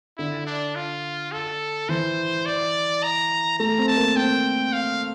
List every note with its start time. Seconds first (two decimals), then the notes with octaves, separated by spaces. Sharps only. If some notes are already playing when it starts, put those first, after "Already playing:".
0.18 D3 E4
0.47 D4
0.76 F4
1.32 A4
1.89 E3 C5
2.46 D5
3.03 A#5
3.59 A3 A#5
3.78 C4
3.88 A5
3.97 A#3
4.16 C4 G5
4.73 F5